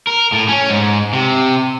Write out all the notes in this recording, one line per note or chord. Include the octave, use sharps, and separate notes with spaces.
A#4
A2
C#4
G#2
C3